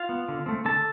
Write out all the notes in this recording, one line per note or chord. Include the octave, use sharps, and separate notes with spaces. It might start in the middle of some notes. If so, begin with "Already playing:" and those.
Already playing: F4 F5
B3
D3
A3 C4
D3 A4 A5